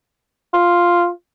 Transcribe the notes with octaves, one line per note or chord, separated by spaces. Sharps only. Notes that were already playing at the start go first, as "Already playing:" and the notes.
F4